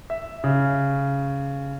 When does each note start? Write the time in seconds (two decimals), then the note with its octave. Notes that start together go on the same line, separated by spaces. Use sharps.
0.10 E5
0.44 C#3